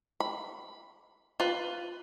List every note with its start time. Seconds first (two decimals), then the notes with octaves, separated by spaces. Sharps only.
0.20 B5
1.40 F4 B4